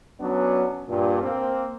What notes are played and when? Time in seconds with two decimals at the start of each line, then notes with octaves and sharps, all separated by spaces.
0.20 F#3 B3 C#4 D4
0.88 G2 A#2
1.23 A#3 C4